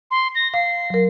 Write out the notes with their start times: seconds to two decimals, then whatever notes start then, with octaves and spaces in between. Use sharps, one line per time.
0.11 C6
0.35 A#6
0.54 F5 C7
0.90 F#3 A#4